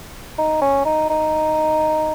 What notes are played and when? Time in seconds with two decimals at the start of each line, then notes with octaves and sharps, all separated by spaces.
0.38 D#4
0.62 C#4
0.85 D#4
1.10 D#4